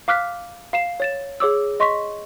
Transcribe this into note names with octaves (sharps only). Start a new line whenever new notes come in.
F5 D6 F6 F#6 B6
F5 C7 E7
C#5 A6 E7
G#4 C#5 D6 E6
D#5 C6 C#6 B6